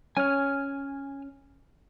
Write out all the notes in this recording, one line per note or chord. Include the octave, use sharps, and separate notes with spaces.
C#4 G#5 F6